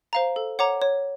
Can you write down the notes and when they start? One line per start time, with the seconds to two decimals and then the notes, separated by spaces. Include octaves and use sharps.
0.13 C5 F5 A#5
0.36 A4
0.59 C#5 F#5 A#5 D6
0.82 C#5